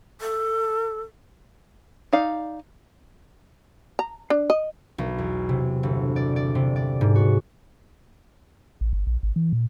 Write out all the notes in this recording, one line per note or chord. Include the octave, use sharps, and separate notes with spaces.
A4
D#4 D5 F5
A#5
D4
D#5
B1
E2
C3
G1
D5
D5
C3
D5
G#2
F#4
A1
G1
A#1
G#1
E3
A#2